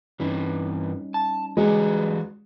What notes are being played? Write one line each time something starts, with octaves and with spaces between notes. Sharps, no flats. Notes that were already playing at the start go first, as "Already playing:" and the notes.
G2 E3 G3 C#4 D#4
A5
E3 G#3 F#4 G4